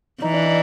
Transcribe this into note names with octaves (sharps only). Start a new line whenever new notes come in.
E3 D#4
D4
D#4